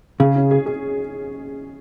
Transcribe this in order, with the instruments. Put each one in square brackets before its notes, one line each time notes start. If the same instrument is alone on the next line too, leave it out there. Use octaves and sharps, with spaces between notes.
[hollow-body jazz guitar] C#3 [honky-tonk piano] G#4
[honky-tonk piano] C#4
G#4
G#4